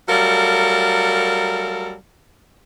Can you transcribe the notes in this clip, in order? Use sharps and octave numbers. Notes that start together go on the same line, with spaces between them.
F#3 G3 A3 A4 A#4 F5